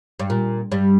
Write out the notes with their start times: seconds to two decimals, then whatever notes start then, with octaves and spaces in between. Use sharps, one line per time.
0.20 G2
0.30 A#2
0.72 G2 G3